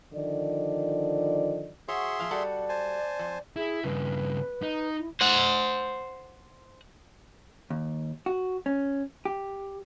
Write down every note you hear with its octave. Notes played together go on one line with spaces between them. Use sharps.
D3 D#3 F3 D5 D#5
F#4 G#4 C#5 E5 C6
A#2 F3 F5
G3 F#4 A4 D5
C5 G#5 A5
F2
E4 G#4
G2 C#3 B4
D#4
E4
C5 F#5
D#2
F#4
C#4
G4